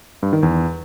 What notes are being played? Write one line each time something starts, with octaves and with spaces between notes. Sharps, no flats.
G2
D#3
E2